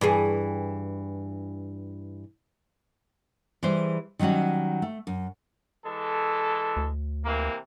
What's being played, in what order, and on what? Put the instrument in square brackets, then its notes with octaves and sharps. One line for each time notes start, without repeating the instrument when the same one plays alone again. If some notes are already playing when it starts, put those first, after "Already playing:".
[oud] G2 E3 G#4
[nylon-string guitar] E3 G3 G#4 C5
D#3 F#3 G3 C#4 F#4
A3
F#2
[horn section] E3 G#3 A4
[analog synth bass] D2
[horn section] C3 E3 A#3